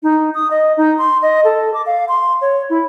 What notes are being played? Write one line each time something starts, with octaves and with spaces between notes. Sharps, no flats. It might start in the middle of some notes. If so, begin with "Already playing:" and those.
D#4
D#6
D#5
D#4
C6
D#5
A4
D6
F5
C6
C#5
E4